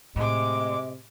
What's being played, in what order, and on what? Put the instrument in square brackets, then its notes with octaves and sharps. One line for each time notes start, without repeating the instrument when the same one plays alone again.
[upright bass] A2 [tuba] C3 [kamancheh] G#3 D6 [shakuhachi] D#5